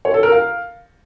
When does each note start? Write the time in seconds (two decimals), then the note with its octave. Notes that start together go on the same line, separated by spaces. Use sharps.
0.05 C#5
0.14 A4
0.23 A#4
0.32 F5